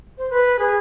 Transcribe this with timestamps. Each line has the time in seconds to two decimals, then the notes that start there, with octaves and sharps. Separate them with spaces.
0.18 C5
0.30 B4
0.59 G#4